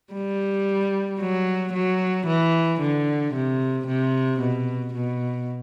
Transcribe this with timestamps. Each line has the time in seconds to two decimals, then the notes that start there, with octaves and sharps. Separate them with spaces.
0.13 G3
1.20 F#3
1.73 F#3
2.27 E3
2.80 D3
3.34 C3
3.87 C3
4.40 B2
4.94 B2